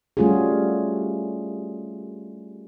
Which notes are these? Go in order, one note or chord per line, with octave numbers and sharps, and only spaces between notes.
G3 A3 C#4 F4 F#4 G#4